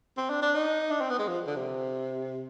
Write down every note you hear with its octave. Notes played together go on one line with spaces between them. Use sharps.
C4
D4
D4
D#4
D4
C4
B3
G#3
F3
D3
C3